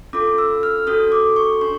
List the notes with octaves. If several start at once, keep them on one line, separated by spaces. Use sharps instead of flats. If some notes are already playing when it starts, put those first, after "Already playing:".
C#4 F4 A4 D6
E6
F6
C#4 F#4 A4 D#6
D6
C#6
D4 C6